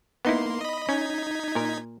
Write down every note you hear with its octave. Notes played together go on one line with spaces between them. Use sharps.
A#3 B3 D#4 E4 C6
D#5 B5
C#4 D#4 G#6 B6
A#2 A#4